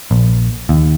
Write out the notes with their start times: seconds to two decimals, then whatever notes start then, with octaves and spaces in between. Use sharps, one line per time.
0.11 A#1
0.69 D#2